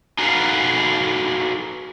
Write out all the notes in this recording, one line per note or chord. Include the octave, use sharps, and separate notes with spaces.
D#4 F#4 G#4 A4 B4 F5